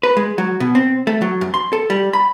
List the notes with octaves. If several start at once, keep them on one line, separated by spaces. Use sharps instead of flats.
B4
G#3
F#3
B2
C4
A3
F#3
F#2
C6
A4
G3
B5